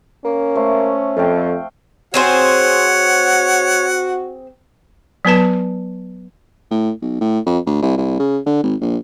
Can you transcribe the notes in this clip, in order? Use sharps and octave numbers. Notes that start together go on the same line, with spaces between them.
A#3 C#4
A3 C5
F2 A3 F5 G5
C4 F#4 G#4 C5 C#5 F#5
F#3 B3 B4 A5
A2
B1
A2
F2
D2
C2
C2
C#3
D3
G#1
A#1